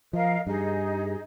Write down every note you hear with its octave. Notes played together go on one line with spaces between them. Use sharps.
F3 A#4 D#5 F5
G2 D#4 G4 G#4 D#5